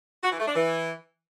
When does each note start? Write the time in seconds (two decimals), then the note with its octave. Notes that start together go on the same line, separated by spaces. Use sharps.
0.24 F#4
0.32 E3
0.40 A3
0.48 D4
0.56 E3